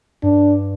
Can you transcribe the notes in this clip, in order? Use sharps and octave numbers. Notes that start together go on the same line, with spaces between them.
G2 D4